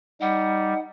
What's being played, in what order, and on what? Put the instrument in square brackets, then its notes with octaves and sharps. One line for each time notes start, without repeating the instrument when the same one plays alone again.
[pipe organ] G3 [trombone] D#4 [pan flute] F#5